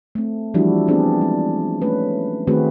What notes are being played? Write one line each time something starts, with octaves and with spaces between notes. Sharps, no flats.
A3 C4
E3 F3 G3 D4 E4 F#4
B3 C4 D4 G#4
G#3
A3 C#4 B4
D#3 A3 C4 F#4 G#4 B4